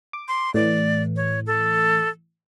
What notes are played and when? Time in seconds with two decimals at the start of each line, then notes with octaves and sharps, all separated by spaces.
0.13 D6
0.28 C6
0.54 A2 E3 D5
1.16 C#5
1.46 A4